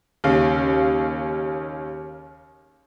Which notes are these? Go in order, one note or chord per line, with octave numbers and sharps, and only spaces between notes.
D#2 C#3 F5